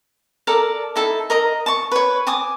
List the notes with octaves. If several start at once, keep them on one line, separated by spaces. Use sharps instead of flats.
A4 A#4 D5 A5
D#4 E4 A4 A5
A#4 D#5 A#5
A5 C#6
B4 C#5
G#5 A5 D6 D#6